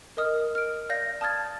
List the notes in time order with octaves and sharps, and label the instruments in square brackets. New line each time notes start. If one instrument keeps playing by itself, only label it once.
[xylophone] A#4 D#5 D#6 F6
F6 D7
D5 F5 G6 A#6
A5 D#6 F6 G#6 A6